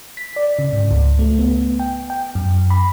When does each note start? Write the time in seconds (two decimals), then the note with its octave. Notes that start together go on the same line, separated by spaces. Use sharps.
0.17 B6
0.36 D5
0.59 C#3
0.73 G#2
0.91 C#2
1.19 A3
1.39 B3
1.80 G5
2.10 G5
2.35 F#2
2.70 B5